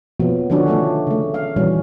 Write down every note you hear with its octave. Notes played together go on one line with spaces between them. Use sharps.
B2 F3 F#3 A#3 B3
D3 D#3 F3 C#4 D4 F#4
D#3 F3 F#3 A3 D4
C#3 A3
F5
A#2 D#3 E3 F#3 G3 C#4